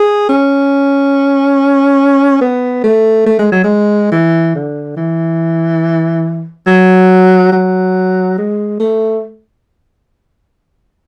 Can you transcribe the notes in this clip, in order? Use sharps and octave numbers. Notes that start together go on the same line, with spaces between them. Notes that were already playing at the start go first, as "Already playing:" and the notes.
Already playing: G#4
C#4
B3
A3
A3
G#3
F#3
G#3
E3
D3
E3
F#3
F#3
G#3
A3